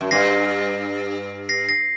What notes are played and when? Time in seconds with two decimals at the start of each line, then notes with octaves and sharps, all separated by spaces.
0.01 F#2
0.11 G2 A#6 C7
1.49 A#6 C7
1.69 A#6 C7